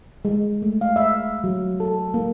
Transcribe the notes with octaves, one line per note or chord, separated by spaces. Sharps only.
G#3
A3
F5
E5
F#3
A4
A#3